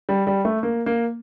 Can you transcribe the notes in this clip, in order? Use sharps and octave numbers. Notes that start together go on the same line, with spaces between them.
G3
G3
A3
A#3
A#3